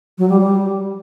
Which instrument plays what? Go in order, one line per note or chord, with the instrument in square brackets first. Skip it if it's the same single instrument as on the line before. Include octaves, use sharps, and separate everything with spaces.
[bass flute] F#3
G3
G3